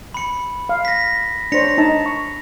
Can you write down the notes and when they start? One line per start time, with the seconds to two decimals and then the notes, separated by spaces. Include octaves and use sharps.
0.14 B5 C#7
0.69 F5
0.85 A#6 B6
1.52 D4 C5 C#5 A#6 C#7 F7
1.78 D#4 A5
2.06 C#6